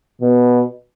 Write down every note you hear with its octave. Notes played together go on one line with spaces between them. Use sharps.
B2